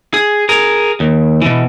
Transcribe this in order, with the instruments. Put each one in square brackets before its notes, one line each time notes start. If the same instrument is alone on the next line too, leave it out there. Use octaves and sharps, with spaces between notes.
[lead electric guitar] G#4
G#4 A#4
D#2
B2 E3